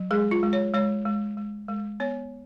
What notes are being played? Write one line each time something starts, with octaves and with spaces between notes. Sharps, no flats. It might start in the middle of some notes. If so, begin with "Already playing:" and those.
Already playing: F#3
G#3 G#4
F4
G#3
C#5
G#3 C#5
G#3
G#3
G#3
B3 C#5